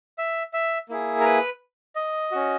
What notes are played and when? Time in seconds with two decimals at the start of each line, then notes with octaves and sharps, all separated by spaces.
0.18 E5
0.53 E5
0.89 A#3 E4 G#4
1.20 A#4
1.25 B4
1.95 D#5
2.31 C#4 F#4